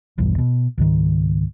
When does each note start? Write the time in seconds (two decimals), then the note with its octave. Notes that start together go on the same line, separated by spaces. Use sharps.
0.18 F1 B1 E2 G2
0.38 B2
0.78 C#2 G#2 D#3